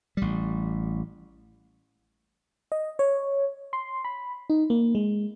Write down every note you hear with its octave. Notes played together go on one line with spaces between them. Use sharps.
A1 G3
D#5
C#5
C6
B5
D#4
A#3
G#3